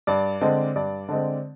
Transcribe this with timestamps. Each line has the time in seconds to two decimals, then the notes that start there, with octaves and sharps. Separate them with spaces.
0.07 G2 D5
0.41 D3 G#3 C4
0.76 G2 D5
1.09 D3 G#3 C4